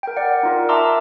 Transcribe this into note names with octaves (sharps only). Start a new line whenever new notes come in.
A#4 G5
D5 F#5
D#4 F4 A#4
E5 A5 A#5 C6 D6 E6